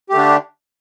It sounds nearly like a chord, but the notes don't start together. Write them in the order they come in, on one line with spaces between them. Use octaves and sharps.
G4 A3 D3 D4